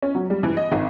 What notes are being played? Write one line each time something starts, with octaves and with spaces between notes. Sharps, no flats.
C#4
F#3
G3
E3
D#5
G#1